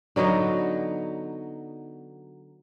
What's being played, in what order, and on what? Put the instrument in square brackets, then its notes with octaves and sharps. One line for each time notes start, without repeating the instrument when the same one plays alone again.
[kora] D3 F#3 B3 D#4